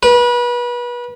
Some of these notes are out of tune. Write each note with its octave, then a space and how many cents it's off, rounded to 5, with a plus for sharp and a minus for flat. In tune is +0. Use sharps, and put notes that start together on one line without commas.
B4 -30